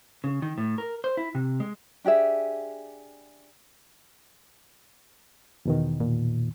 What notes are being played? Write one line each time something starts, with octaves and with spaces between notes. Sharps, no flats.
C#3
D#3
A2
A#4
C5
E4
C3
G#3
D4 G4 G#4 E5
E2 B2 D#3
A#2